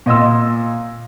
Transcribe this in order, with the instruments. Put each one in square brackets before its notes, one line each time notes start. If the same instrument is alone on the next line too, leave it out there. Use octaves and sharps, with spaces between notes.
[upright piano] A#2 D#5 C6 E6